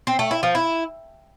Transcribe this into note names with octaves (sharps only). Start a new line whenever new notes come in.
C4
A3
E4
F3
E4